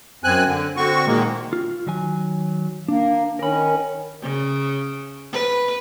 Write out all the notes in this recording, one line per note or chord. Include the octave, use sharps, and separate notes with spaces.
F#2 C4 G#5 F#6
D3
D3 C4 F#4 C#6
A#2 D#3 G#3 A#3
F4
D#3 F#3 G#5
A#3 D4
D#3 C#4 A#4 B5
C#3
B4